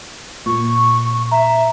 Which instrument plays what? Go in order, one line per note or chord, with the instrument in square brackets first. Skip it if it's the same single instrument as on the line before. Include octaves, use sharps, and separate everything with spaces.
[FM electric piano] A#2 [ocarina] C#6
[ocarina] E5 [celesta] A#5